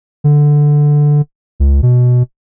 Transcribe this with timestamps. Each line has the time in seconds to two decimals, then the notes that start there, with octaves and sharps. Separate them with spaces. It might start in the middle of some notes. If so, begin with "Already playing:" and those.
0.24 D3
1.60 C#2
1.83 B2